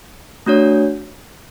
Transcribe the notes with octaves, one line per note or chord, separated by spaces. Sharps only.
A3 D4 F#4 C#5